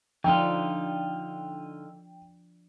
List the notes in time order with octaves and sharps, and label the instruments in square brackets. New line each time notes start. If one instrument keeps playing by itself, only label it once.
[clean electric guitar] D3 D#4 F4 [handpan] F3 D4 [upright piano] G5